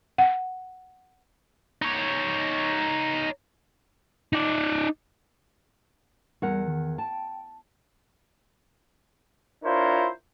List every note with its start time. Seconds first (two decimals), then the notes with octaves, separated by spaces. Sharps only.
0.18 F#5
1.82 D#4 C#5
4.33 D#4 D5
6.42 E2 G3 A#4 F#5
6.68 D#3
6.98 G5 A5
9.64 D4 E4 F4 A#4 C5 C#5